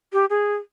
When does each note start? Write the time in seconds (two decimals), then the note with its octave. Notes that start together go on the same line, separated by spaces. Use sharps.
0.13 G4
0.30 G#4